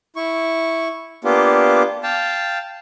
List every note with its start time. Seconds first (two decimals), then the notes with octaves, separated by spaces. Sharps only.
0.16 E4 C#6
1.24 A#3 B3 D4 F4 G4
2.03 F5 G5 A5